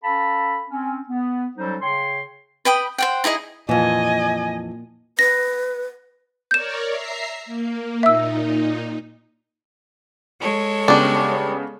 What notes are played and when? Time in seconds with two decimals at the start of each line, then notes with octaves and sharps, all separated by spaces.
0.04 C#4 A4 F5 A5 B5
0.70 C4 C#4
1.09 B3
1.58 F#3 G3 C#4 D#4 A4 C5
1.82 C#3 C#5 G5 C6
2.65 B4 G5 B5 D#6
2.98 C5 F#5 G5
3.24 D#4 E4 G#4 D#5
3.69 F2 A#2 E3 D#5 G#5
5.19 B4 A#6
6.51 A#4 C#5 D5 G6 E7
6.89 E5 A#5 C7
7.46 A#3
8.03 A#2 D#4 E5 E6
10.40 G#3 A4 C#5
10.88 C#3 G3 B3 D4